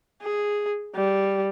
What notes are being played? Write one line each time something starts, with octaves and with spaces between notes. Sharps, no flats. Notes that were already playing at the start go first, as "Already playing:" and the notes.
G#4
G3